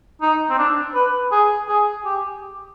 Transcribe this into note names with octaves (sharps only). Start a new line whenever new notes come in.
D#4
C4
D4
B4
G#4
G#4
G4